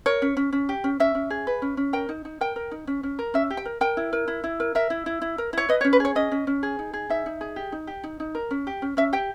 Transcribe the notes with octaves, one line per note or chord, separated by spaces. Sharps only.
A#4 C#5
C#4
C#4
C#4
G4
C#4
C#4 E5
C#4
G#4
B4
C#4
C#4
A#4 G5
D#4
D#4
A#4 G5
A#4
D#4
C#4
C#4
A#4
C#4 E5
G4
G5
A#4
A#4 G5
E4
A#4
E4
E4
A#4
A#4 E5
E4
E4
E4
A#4
E4 C#5
B4 D#5
C#5
C#4
B4
G#4 C#5
C#4 D#5
C#4
C#4
G#4
D#4
G#4
D#4 E5
D#4
G#4
G4
D#4
G4
D#4
D#4
A#4
C#4
G4
C#4
C#4 E5
G4 G5